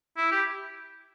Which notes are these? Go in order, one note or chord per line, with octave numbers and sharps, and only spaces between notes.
E4
G4